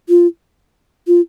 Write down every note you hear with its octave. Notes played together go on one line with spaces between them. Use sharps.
F4
F4